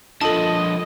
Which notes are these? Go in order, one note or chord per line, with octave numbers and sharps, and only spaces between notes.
D3 F3 A4 D#5 A5